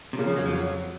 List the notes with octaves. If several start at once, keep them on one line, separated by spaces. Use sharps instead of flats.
C3
A#2 C#3
F3
F2 F#3
F3
F#3